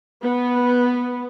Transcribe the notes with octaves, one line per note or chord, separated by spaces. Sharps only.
B3